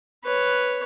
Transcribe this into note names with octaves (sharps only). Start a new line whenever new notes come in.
B4 C#5